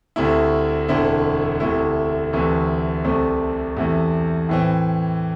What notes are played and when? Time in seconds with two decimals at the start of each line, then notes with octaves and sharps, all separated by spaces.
0.16 D2 C3 A3 E4
0.89 E1 D2 D3 C4 E4
1.60 D2 C3 A3 E4
2.33 D2 C3 E3 A3
3.04 C2 C3 A3 C4
3.77 E2 C3 A3 E4
4.49 A2 E3 C4